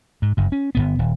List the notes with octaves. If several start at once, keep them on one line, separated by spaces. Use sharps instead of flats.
G#2
F#1 G2
C#4
G1 D#2 B3
D#1